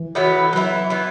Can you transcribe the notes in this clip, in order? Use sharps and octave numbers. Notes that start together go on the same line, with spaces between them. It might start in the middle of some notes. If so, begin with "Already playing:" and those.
Already playing: E3
A2 F#3 B3 E4
E3 F#3 B3 E4
E3 B3 E4